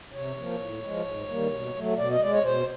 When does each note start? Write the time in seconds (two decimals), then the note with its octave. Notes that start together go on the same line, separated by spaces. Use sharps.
0.13 C3 C#5
0.37 F3 A#3
0.60 A2
0.83 F3 G#3
1.06 G#2
1.29 D#3 G3 A#3
1.52 B2
1.76 F#3 A3
1.98 B2 D5
2.10 D#5
2.21 G#3 D5
2.32 C#5
2.44 B2 C5